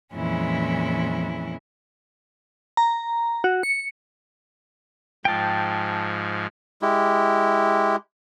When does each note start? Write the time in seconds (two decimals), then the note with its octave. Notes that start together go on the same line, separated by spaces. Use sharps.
0.14 F2 A#2 E3 G#3 C#4 E4
2.77 A#5
3.44 F#4
3.63 C#7
5.25 G#2 F3 G5 A5
6.82 G#3 E4 G4